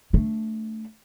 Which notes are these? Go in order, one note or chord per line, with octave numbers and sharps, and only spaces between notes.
A3 D4